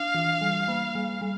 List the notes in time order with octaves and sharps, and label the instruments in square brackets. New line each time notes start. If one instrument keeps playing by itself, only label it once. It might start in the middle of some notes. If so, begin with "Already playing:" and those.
Already playing: [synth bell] D4 [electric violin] F5
[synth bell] E3
G3
A#3
G3
G3